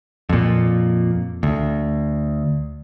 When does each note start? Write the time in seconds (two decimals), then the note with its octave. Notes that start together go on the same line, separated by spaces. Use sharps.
0.29 F2 A#2
1.43 D2